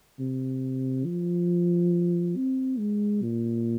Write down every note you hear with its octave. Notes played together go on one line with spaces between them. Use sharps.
C3
F3
C4
G#3
A#2